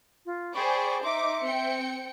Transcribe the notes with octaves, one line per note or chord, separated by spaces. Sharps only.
F4
G#4 C5 D5 G5 B5 C#6
D#4 E5 C6 D6
C4 G5 C#7